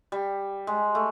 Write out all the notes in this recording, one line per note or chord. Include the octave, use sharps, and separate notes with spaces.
G3
G#3
A3